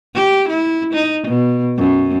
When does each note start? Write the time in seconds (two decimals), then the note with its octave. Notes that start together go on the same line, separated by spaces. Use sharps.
0.14 G4
0.49 E4
0.94 D#4
1.28 B2
1.77 F#2